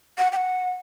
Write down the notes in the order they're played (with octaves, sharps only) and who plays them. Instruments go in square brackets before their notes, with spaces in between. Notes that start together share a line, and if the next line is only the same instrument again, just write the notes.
[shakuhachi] F#5
G5
F#5